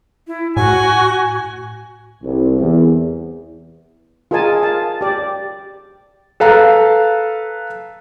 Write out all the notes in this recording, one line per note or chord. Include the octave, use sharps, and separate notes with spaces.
E4
A2 F#4 G#5
C2
E2
F4 G#4 A#4 D#5 G#5 A5
F5 A5
G4 D5
A4 B4 F5 A#5